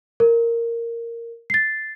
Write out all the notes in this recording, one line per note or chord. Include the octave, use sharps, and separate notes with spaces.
A#4
A6 C7